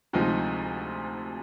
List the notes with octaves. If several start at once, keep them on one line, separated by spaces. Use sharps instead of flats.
D2 C3 F3 G#3 D#4